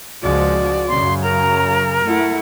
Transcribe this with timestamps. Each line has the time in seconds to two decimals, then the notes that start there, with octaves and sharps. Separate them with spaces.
0.22 C#2 F3 G#3 F#4 D5
0.88 F#2 C#3 C6
1.23 A#4 A#5
2.05 A3 E4 F#5